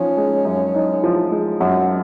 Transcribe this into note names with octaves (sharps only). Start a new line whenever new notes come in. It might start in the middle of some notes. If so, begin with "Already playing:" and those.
Already playing: F3 C#4 D#4
G#3
F#2
D#4
F3
G#3
F#2 F#4